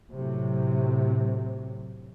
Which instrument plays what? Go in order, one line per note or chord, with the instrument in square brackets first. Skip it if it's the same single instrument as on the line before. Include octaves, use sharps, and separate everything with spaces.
[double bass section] A2 C3 F#3